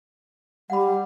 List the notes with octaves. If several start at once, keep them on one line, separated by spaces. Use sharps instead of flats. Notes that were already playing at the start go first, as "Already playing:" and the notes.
G3 F#5 B5